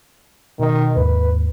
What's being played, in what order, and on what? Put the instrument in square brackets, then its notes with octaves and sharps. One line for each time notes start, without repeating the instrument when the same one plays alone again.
[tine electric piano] B2 D#5 [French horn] D#3
[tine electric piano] D#2 G#2 [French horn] B4